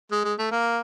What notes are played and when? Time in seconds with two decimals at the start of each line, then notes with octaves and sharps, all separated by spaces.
0.12 G#3
0.24 G#3
0.39 A3
0.52 A#3